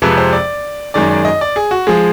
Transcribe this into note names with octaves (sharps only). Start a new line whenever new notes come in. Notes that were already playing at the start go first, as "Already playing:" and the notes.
F2 C3 F3 G#3 B4
C5
D5
F#2 D#3 G#3 D5
D5
D#5
D5
G#4
F#4
F3 G#3 G#4